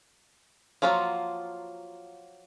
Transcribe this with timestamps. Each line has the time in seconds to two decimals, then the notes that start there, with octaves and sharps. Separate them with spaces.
0.82 F3 F#3 A#3 F4 F#4